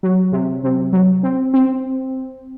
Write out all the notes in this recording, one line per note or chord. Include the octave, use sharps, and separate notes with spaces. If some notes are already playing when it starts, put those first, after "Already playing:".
F#3
C3
C3
F#3
C4
C4